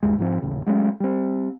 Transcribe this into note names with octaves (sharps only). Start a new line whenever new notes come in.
G1 D#2 G#3
G#2 F3 C4
D#1 A1 A2 C#3
F#3 G#3 A3 C#4
G3 C4